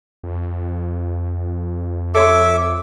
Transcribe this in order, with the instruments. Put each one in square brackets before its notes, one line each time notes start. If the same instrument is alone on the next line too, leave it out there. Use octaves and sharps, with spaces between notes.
[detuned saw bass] F2
[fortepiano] A4 C#5 C6 [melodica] E5 D6